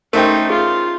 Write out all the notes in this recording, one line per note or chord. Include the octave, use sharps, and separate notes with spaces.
A3 C#4 D#4 A#4 C5 E5 G5
F4 G#4